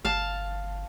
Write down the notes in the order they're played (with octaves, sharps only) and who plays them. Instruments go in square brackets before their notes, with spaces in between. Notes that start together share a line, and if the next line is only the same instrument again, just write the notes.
[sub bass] G1 [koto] F5 A5